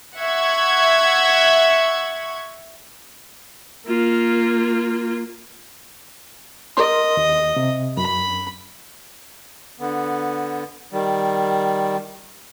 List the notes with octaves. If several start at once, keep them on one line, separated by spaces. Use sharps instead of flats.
E5 F#5 C#6 G#6
A#3 F4
A#4 D#5 C6
D#2
C3
F#2 B5
D3 B3
D#3 G3